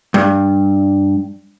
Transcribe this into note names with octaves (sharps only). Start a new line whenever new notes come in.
G2